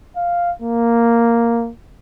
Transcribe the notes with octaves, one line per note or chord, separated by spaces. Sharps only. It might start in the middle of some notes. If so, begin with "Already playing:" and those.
F5
A#3